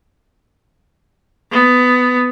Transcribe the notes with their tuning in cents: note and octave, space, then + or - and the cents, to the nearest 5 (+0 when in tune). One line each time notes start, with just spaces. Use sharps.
B3 +15